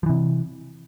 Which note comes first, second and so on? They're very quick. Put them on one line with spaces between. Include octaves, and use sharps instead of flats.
F3 E3 C3